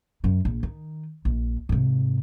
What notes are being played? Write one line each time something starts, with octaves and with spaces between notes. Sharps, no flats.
F#2 F#3
A#1
D#3
A#1
G#2 C3